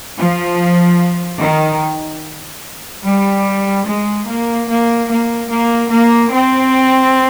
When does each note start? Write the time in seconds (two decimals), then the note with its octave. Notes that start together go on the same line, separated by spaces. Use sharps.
0.17 F3
1.40 D#3
3.05 G3
3.87 G#3
4.28 A#3
4.70 A#3
5.10 A#3
5.51 A#3
5.92 A#3
6.33 C4